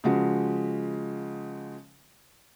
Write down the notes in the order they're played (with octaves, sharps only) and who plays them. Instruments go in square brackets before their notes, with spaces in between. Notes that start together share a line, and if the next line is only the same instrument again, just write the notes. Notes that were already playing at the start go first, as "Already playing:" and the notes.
[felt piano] C#3 F3 G#3 F#4